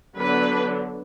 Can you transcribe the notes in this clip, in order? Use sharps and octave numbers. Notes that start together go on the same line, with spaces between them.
D3 F#3 B3 D4 B4